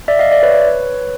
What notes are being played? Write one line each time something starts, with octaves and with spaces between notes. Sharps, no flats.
D5 E5
D#5 F5
D5 E5
B4 C#5